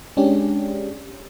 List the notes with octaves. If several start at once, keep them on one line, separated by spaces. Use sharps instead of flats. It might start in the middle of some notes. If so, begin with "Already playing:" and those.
G#3 C#4 D4 G4